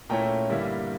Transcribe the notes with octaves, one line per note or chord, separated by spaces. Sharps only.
A#2 A3 C#4 E4 G5 A#5
G2 D3 G3 A#3 E4